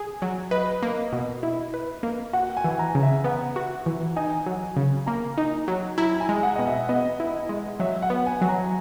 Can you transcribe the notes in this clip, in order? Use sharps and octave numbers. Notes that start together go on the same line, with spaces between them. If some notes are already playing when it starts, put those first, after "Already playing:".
Already playing: G#4
F#3
B4 D#5
A#3
B2
E4
B4
A#3
F#4 F#5
G#5
E3
G#5
A#5
C#3
E5
B3 F#5
F#4
E3
D#4 G#5
F#3
C#3
A#3 A#5
D#4
F#3
E4 A#5
G#5
G#3
F#5
B2 D#5
E5
B3 D#5
E4
G#3
F#3 E5
F#5
B3
G#5
F#3
A#5